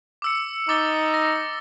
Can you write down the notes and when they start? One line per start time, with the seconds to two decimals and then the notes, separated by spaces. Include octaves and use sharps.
0.22 D6 E6 C#7
0.69 D#4 D6 A6 G7
1.14 A#6